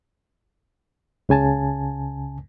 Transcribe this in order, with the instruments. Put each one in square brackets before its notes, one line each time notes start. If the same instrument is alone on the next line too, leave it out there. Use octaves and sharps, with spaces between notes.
[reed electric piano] C#2 C#3 G#5 A5